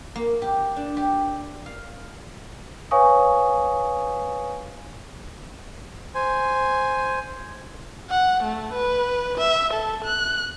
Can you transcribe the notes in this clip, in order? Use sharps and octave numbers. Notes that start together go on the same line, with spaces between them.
A#3
G4
D4
G4
F5
B4 C#5 F5 G#5 C#6 D#6
C5 G#5
F#5
A3
B4
E5
A4
F#6